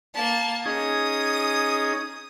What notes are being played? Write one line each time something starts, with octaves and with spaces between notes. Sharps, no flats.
A#3 A5
C#4 D#4 G#4 D#6